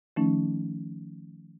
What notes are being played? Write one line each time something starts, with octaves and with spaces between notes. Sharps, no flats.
D#3 F3 A3 C#4 D#4